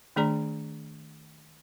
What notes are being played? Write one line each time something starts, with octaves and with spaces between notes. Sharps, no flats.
D#3 A3 D4 G#4 D5 A#5